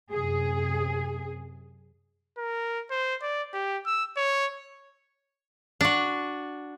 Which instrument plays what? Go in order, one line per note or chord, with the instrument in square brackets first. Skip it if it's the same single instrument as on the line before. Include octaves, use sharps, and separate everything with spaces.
[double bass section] F#2 C3 [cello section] G#4
[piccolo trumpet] A#4
C5
D5
G4
E6
C#5
[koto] D4 F#4